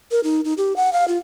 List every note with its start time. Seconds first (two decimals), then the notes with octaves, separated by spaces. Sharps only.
0.11 A#4
0.24 D#4
0.45 D#4
0.58 G4
0.76 F#5
0.93 F5
1.08 F4